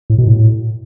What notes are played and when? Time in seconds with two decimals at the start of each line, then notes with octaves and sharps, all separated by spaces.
0.10 A2
0.18 B2
0.27 A2